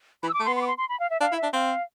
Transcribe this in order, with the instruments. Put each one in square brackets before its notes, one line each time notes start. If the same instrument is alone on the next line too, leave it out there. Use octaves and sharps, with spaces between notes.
[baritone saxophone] E3 [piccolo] B5
[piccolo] E6
D6
[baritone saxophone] A3
[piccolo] C6
[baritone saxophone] B3
[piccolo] C6
D6
C6
C6
B5
F5
E5
[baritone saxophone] D4 [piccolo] F5
[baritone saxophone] E4
[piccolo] E5
[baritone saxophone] D4
[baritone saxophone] C4 [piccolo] F5